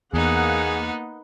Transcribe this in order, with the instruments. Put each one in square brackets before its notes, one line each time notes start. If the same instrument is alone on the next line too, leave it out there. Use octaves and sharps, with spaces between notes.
[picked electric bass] E2 [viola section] A#3 F#5 [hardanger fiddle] B3 D#4 [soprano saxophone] G#4